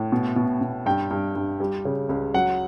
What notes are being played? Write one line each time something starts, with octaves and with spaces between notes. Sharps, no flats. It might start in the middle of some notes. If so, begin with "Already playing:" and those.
Already playing: A2
B2
B2
B2
G2 G5
G2
G2
G3
C#3
C#2
F#3 F#5